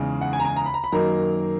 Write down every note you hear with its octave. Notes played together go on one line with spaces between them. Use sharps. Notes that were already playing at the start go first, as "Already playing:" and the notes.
Already playing: E2 C#3 G#3 D#4
F#5
G#5
A#5
G#5
A#5
B5
A#5
B5
F#2 D#3 F#3 A#3 D#4 A#5